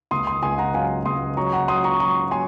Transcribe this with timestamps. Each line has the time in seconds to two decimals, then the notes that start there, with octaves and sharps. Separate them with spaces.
0.11 C#2 C6 D#6
0.27 C6 D#6
0.43 C#2 G#5 C6
0.58 F#5 A#5
0.74 F#3 F5 G#5
1.05 C#2 C6 D#6
1.37 F#3 A#5 C#6
1.53 F#5 A#5
1.68 F#3 C6 D#6
1.84 A#5 C#6
2.00 F#3 A#5 C#6
2.31 F#3 G#5 C6